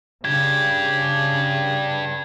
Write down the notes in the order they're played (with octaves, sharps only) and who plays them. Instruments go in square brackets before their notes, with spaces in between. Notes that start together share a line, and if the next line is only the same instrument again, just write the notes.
[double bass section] C#3 [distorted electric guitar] D4 G4 [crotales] G#6